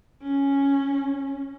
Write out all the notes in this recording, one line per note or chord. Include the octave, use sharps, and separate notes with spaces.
C#4